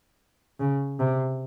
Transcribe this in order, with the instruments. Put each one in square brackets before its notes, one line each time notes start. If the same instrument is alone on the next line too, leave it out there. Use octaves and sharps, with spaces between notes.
[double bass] C#3
C3